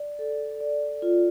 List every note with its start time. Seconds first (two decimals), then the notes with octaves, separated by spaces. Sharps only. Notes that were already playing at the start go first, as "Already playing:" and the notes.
Already playing: D5
0.19 A4
0.60 D5
1.02 F4